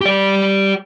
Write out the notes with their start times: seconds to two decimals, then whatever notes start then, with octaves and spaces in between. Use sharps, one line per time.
0.01 G4 D5